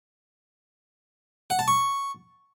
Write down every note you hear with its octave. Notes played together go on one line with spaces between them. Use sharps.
F#5
A5
C#6